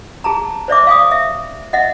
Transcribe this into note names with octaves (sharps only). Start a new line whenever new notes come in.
G#4 A5 A#5
C5 D5 E5 D6
F5 G#5 D#6
E5
D#5 E5 F#5